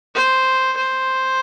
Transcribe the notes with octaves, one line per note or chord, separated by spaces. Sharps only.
C5
C5